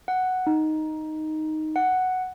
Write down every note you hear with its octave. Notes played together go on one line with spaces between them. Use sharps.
F#5
D#4
F#5